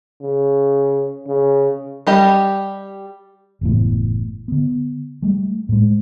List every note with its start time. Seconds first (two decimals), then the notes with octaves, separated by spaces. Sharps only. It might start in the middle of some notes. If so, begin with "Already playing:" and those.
0.22 C#3
1.27 C#3
2.07 G3 G4 D#5
3.61 F#1 E2 A2
4.48 D3 B3
5.22 G3 A3
5.69 A2 G#3